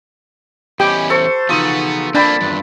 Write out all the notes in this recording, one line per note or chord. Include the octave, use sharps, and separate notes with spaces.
E2 C#4 G4 D#5 G5 G#5 B5
A4 C5 C#6
C#3 E3 F3 B3 D#4 F#4 D#6
A#3 C4 D4 G5 A5 B5
E2 G2 D#3 F#3 B4